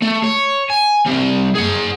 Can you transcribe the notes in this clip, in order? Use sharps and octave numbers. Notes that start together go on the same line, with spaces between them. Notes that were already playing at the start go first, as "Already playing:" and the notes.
A3
C#5
G#5
G3 C4
G#4 F#5